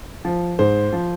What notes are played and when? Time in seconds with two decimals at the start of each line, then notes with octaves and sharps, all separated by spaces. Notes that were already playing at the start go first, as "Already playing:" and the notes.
0.25 F3
0.59 G#2 C5
0.93 F3